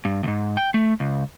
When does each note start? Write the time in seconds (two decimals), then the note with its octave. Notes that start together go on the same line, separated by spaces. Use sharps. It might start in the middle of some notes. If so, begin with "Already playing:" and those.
0.05 G2
0.23 D2 G#2
0.57 G5
0.74 A3
1.00 C#2